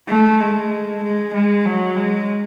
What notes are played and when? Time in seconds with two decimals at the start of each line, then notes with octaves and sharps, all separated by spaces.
0.08 A3
0.40 G#3
1.03 G#3
1.34 G#3
1.66 F#3
1.97 G#3